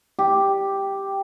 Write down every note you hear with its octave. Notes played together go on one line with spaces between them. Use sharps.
G4